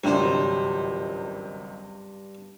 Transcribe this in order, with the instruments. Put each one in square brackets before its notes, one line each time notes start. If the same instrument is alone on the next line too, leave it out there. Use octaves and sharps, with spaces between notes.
[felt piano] G#1 C#2 F#3 [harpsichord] G2 C5 [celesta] D4 G5